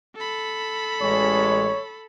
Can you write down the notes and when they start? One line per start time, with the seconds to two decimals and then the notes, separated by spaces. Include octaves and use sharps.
0.15 A4 B5
1.01 A1 G#3 C#5